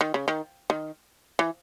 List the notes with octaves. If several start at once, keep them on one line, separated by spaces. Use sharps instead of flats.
D#3
C#3
D#3
D#3
E3